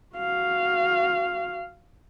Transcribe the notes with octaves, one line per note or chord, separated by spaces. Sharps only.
F#4 F5